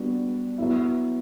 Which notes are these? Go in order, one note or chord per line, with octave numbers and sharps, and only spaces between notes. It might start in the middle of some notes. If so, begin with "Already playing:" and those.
Already playing: G3 B3 D4 F#4 B4
F#3 B3 E4